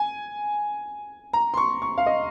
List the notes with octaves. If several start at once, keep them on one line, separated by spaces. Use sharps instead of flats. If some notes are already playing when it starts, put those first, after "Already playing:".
Already playing: G#5
A#5
C6
C#6
C#6
F5
D#5